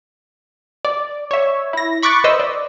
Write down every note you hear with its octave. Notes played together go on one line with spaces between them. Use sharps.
D5
C#5 E5
E4 A#6
B5 C#6 D6 F#6 A6
B4 C5 D#5 E5 E6
D5